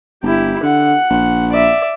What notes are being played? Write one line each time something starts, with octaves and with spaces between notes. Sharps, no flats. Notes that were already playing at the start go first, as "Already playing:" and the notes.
G1 E4 G4
D3 F#5
A#1
D5 E5